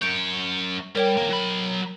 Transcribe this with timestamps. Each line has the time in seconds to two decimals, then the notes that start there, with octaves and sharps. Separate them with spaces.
0.02 F#2 C#5 G6 D7
0.95 G3 A#4 C#5 G5
1.17 E2 A#3
1.30 F#3 B5